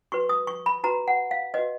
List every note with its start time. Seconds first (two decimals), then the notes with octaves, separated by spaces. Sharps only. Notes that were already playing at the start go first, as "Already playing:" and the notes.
0.12 F#4 B4 C#6
0.29 D#6
0.47 C#6
0.66 B5
0.84 F#4 B4 A#5
1.08 F#5
1.31 F5
1.54 F#4 B4 D#5